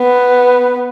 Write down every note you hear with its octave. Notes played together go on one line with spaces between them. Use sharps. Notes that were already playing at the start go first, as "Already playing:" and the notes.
Already playing: B3